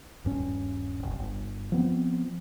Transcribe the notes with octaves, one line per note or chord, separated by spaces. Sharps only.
D#1 G2 C#4
F#1 C2
G1
F3 B3 C4